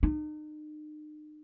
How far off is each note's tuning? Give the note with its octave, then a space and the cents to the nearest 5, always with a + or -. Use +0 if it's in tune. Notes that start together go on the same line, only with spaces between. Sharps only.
D#4 -40